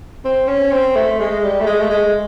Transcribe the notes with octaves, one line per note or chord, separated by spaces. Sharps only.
C4
C#4
C4
A3
G#3
G3
A3
G#3
A3
G#3